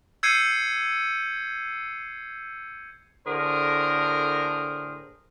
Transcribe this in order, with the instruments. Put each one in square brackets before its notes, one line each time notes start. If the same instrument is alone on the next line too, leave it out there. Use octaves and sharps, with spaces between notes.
[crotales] E6 G6 G#6 C7 C#7 D#7
[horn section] A2 D3 G#4 A#4 C5